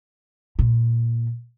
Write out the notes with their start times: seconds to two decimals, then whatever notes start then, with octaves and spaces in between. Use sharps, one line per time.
0.59 A#2